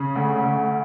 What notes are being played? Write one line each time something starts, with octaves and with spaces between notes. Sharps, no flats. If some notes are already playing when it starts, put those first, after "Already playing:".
Already playing: C#3
D2
D2